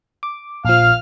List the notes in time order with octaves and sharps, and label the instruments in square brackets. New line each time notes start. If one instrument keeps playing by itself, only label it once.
[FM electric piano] D6
[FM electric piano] A#1 F3 [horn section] F5 [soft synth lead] F6